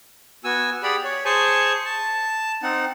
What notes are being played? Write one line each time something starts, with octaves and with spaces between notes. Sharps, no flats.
B3 F#4 G#5 E6
G4 G#4 D5 F#5 B5
C#5
G#4 C5 G#5 A5 C#6
A5
C4 D#4 F#5